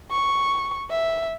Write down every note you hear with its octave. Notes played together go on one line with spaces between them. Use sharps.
C#6
E5